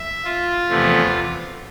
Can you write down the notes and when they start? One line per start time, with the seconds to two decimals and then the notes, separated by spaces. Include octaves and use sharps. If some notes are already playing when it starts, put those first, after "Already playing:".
Already playing: E5
0.24 F4
0.70 E2 C3 F3 A3